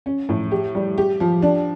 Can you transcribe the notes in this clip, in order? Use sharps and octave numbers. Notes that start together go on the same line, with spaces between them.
C#4
A2
G4
G3
G4
F3
D4